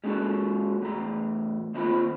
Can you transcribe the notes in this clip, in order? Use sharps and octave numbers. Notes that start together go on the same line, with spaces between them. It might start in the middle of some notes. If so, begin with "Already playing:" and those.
G3 G#3 A#3 C#4 F#4 A4
E2 A2 A#5
D#3 A#3 C4 F4 G#5 B5